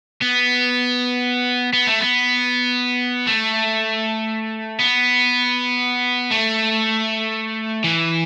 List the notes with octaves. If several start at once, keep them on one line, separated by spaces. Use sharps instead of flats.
B3
B3
A3
B3
A3
B3
A3
E3